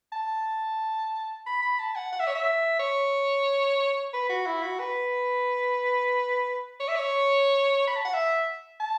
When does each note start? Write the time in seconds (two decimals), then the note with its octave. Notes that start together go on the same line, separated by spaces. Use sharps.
0.12 A5
1.46 B5
1.63 B5
1.79 A5
1.96 F#5
2.13 F#5
2.20 E5
2.27 C#5
2.35 E5
2.79 C#5
4.13 B4
4.30 F#4
4.46 E4
4.63 F#4
4.80 B4
6.80 C#5
6.88 E5
6.96 C#5
7.88 B5
7.97 A5
8.05 F#5
8.14 E5
8.80 A5